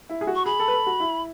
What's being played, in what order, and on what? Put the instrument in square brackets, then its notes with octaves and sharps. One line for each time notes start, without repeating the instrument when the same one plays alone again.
[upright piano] E4
G#4
F#4
[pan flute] C#6
[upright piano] G#4 [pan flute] B5
[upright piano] A4
B4
A4
F#4
E4